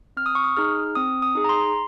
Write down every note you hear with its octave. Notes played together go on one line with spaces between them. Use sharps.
C4 F6
D#6
C#6
D#6
D#4 G#4 F6
C4 D#6
D#6
D#4 G#4
A#5
C6